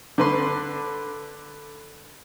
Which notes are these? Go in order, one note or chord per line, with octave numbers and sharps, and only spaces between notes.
D3 B4 C6